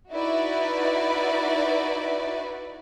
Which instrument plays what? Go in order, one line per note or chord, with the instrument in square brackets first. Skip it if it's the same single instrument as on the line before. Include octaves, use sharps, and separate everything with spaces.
[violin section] D#4 E4 F#4 B4 D5